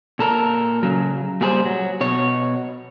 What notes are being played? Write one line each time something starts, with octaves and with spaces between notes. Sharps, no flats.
A#2 A4 A#4
C#3 F#3
A#2 G3 G#4 A#4 C5
F#3
B2 C#5